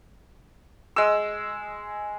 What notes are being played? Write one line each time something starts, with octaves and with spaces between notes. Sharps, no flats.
G#3 E6